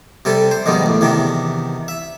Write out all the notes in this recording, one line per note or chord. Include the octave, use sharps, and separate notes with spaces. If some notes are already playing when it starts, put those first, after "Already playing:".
C3 G3 C4 A4
C5
F2 B2 D#3 G3 G#3
A1 E2
E2 C3 D#3 D4
E5